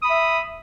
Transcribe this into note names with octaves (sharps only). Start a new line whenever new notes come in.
E5 B5 D#6